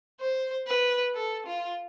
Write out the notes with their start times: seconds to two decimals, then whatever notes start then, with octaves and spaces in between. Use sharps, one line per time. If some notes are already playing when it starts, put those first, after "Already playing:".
0.20 C5
0.67 B4
1.15 A4
1.46 F4